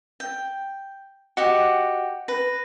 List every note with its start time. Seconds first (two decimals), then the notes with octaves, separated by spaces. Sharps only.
0.20 G5
1.37 F#4 G4 D#5 F#5
2.28 B4 A#6